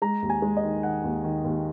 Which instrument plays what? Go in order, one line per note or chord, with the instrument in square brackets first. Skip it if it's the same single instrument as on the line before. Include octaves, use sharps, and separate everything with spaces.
[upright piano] G#3 A#5
D#2
G#5
G#3
D#5
D#3
D#3 F#5
D#2
D#3
D#2